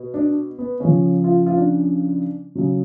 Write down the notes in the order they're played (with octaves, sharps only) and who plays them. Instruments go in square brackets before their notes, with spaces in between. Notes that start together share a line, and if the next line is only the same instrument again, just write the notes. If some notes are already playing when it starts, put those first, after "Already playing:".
Already playing: [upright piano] B2
D4
B3
C#3 F3 C#4
F4
F4
D4
C#3 F#3